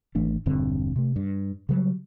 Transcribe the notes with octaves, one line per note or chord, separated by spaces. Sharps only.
G#1 E3 A3 D4
E1 G2 D3 C4
C3 A3
G2
C#3 F#3 G3